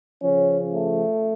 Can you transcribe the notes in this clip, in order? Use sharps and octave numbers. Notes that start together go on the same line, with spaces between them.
C#3 F3 C#4
A3